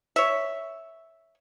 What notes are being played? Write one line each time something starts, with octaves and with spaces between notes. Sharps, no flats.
C#5 E5